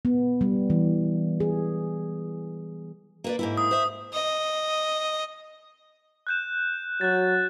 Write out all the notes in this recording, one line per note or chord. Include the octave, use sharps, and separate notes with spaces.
B3
G3
E3
G#4
A#3 B4 D5
G#2 A#3 E4
D#6
C5 E5
D#5
F#6 G6 E7
F#3 F#6 A6